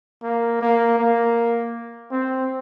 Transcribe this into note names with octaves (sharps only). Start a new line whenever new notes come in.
A#3
A#3
A#3
C4